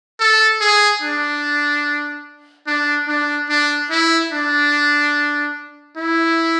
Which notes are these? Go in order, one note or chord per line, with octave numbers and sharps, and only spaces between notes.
A4
G#4
D4
D4
D4
D4
E4
D4
E4